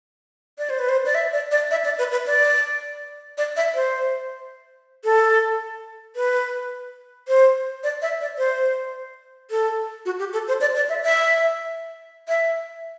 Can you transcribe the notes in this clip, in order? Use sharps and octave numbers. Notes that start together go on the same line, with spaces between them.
D5
C5
B4
C5
D5
E5
D5
D5
E5
D5
B4
B4
D5
D5
E5
C5
A4
B4
C5
D5
E5
D5
C5
A4
F#4
G4
A4
C5
D5
D5
E5
E5
E5